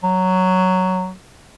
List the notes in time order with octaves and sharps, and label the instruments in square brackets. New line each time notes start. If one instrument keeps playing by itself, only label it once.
[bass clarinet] F#3